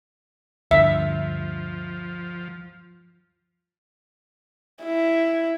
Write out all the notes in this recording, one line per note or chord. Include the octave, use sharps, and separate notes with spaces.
D2 G2 D3 F3 E5
E4